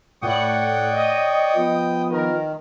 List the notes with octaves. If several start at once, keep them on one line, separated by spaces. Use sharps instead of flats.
A2 C#5 D5 F#5 G5 C#6 D#6
D#5
F3 B3
D#3 A#4